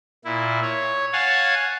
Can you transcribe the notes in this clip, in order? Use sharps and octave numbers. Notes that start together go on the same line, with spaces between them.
A#2 E4
C#5
C#5 F5 F#5 G#5 A5